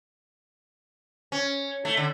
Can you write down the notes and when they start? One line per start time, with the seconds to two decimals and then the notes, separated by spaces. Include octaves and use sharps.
1.32 C#4
1.85 A3
1.97 D3